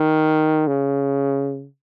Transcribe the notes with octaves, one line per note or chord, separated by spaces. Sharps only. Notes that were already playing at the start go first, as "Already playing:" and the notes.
Already playing: D#3
C#3